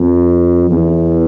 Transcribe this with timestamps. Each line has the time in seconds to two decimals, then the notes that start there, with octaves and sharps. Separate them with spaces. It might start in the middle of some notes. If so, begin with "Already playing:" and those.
Already playing: F2
0.71 E2